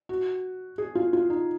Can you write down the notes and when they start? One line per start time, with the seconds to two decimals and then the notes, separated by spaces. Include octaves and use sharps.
0.09 F#4
0.78 G#4
0.95 F4
1.13 F4
1.30 D#4